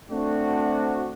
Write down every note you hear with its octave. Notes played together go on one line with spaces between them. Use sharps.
A3 C4 D4 F#4